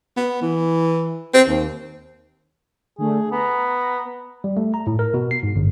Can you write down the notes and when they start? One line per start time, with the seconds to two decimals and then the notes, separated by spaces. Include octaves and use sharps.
0.17 B3
0.42 E3
1.34 C4
1.48 D#2
2.98 D3 A3 G#4
3.32 B3 A#5
4.44 G3
4.57 A3
4.74 A#5
4.87 A2
4.99 A#4
5.14 B2
5.31 C7
5.43 G#2
5.56 G1